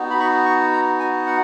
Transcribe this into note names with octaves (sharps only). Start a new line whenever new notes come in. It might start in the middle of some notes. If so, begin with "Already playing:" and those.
Already playing: B3 D#4 F#4
B5
C#6
C#6
A#5
G#5
F#5